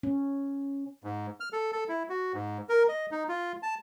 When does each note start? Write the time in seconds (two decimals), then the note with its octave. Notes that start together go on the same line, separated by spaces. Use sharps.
0.03 C#4
1.04 G#2
1.40 F6
1.53 A4
1.72 A4
1.89 E4
2.09 F#4
2.34 G#2
2.69 A#4
2.89 D#5
3.11 D#4
3.29 F4
3.63 A5